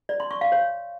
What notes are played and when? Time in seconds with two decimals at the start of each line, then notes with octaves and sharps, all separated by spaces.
0.09 D5
0.20 C6
0.31 C#6
0.41 F5
0.52 C#5